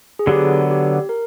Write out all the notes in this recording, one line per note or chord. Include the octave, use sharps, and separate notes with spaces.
G#4
D3 F#3 B3 G4
G4
A#4